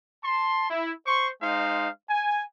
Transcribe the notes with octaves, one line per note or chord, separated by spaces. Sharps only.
A5 C6
E4
C5 C6 C#6
G#3 D#4 C5 F5
G#5